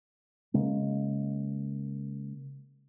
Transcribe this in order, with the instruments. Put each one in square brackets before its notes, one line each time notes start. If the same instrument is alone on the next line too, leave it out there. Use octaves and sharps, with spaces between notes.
[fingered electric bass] C#3 G#3 A#3